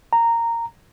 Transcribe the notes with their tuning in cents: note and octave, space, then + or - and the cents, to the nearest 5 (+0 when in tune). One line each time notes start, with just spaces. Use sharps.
A#5 -10